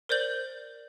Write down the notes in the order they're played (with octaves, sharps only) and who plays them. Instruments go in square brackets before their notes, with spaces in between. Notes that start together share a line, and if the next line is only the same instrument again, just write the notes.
[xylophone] A#4 C5 D5 G6 F#7